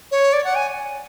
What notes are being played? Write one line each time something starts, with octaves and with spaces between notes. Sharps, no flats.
C#5
D5
F#5
G#5